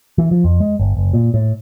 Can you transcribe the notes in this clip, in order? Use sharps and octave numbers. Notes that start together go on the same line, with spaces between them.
E3
F3
F2
G#3
G1
F#1
A#2
A2